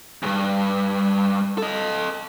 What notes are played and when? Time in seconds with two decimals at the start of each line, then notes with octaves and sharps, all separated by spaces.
0.23 D2 G2
1.58 A4 D#5